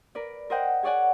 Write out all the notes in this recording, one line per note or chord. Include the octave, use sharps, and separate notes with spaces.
A#4 B4 D5
A#4 C5 D#5 F#5 G5
G#4 C#5 D5 F#5 G#5